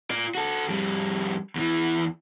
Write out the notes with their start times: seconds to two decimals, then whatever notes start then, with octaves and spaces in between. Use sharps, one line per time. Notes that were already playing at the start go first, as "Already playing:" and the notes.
0.10 F4 D5
0.35 F#4 A4
0.68 F2 G3
1.56 E2 E3